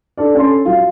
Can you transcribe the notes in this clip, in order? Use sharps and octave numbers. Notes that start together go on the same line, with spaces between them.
D4 A4 D5
C#4 A4 C6
F#3 F4